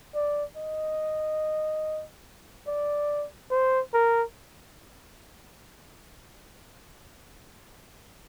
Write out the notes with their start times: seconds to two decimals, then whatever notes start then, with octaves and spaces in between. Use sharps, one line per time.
0.15 D5
0.57 D#5
2.67 D5
3.51 C5
3.94 A#4